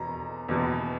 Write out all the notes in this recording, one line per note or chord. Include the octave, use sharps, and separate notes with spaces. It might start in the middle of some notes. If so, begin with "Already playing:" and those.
Already playing: E2 B2 A#5
E2 B2